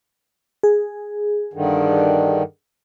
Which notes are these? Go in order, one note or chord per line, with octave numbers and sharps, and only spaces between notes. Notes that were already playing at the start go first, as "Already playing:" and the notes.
G#4
G2 D3 D#3